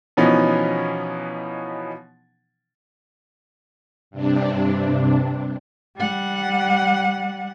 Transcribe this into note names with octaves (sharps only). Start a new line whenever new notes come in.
B2 E3 F3 B3 C#4 D#4
G2 C3 D4
G3 F#5